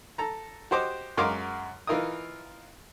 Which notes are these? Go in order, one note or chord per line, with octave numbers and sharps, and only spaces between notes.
A4 A#5
F#4 G4 C5 D#5 D6
F#2 G#3 A#4 F5 C6 D6
E3 D#4 F4 A#4 E5 D#6